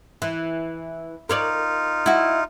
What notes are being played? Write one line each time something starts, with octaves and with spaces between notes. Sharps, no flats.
E3
D#4 F4 A#4 C#5 D5
E4 F#4